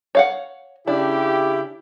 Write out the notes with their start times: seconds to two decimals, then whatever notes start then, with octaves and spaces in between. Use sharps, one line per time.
0.15 C#5 F5 F#5
0.87 C#3 D4 E4 G4